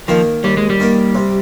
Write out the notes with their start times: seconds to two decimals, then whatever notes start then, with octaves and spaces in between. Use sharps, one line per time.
0.08 D#3 F3 A#3
0.44 D#2 G3
0.57 G#3
0.70 G3
0.80 D#3 A#3
1.15 C3